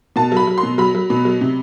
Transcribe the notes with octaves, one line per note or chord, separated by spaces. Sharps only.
B2 A5
F#3 B5
F#3
C6
B2
F#3 B5
F#3
B2
F#3
C3